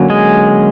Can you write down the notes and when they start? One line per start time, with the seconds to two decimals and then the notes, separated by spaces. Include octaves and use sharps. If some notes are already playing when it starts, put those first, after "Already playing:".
Already playing: D3 F#3 A#3 C#4
0.10 G#3 G#4